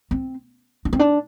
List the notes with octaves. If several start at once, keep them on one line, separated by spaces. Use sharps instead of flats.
C4
D4
C4
D4